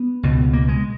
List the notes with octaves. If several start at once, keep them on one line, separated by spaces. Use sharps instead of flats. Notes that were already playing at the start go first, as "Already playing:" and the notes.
Already playing: B3
C#2 B2
A#3
G#3